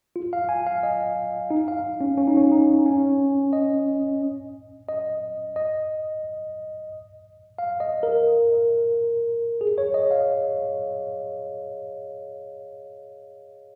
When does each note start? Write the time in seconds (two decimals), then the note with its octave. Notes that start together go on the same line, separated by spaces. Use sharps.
0.16 F4
0.33 F5
0.49 G#5
0.66 F5
0.83 D#5
1.51 D#4
1.68 F5
2.01 C#4
2.18 C#4
2.28 D#4
2.37 C#4
2.51 D#4
2.86 C#4
3.53 D#5
4.88 D#5
5.56 D#5
7.58 F5
7.80 D#5
8.03 A#4
9.61 G#4
9.78 C#5
9.94 D#5
10.11 F5